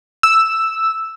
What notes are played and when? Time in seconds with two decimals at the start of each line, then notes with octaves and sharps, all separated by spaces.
0.23 E6